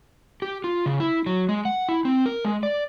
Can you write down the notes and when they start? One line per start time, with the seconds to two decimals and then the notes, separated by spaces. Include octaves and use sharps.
0.42 G4
0.64 F4
0.86 C#3
1.00 E4
1.26 F#3
1.49 G#3
1.65 F#5
1.89 E4
2.05 C4
2.26 A#4
2.45 G#3
2.63 D5